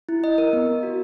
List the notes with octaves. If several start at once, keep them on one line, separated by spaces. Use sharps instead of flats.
E4
D#5
A#4
B3
B3
F#4